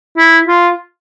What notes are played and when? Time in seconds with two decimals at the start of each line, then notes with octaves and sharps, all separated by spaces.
0.17 E4
0.48 F4